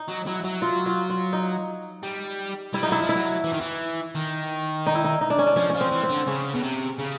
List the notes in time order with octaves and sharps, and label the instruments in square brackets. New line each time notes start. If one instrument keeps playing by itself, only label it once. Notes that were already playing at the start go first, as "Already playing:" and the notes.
Already playing: [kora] D#4
[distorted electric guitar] F#3
[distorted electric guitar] F#3 [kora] E4
[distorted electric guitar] F#3
[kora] F4
F4
F4
D#4
[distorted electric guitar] G3
[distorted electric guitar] G3 [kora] E4
[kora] D#4
[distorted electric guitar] F#3 [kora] E4
[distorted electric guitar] F3
[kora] E4
[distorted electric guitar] F#3
E3
D#3
E3
D#3
[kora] D#4
E4
D#4
D#4
D4
C#4
D4
[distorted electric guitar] F3 [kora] C#4
[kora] C#4
[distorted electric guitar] F3
[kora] C4
[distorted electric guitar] E3
[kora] C4
[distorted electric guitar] D3
[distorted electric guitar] C#3 [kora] C#4
[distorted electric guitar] B2
C3
C#3